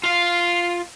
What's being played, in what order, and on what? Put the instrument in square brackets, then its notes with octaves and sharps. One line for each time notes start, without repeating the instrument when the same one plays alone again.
[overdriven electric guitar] F4 F5